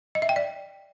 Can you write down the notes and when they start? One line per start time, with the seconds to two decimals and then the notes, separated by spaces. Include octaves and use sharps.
0.15 D#5
0.22 E5
0.29 G5
0.36 D5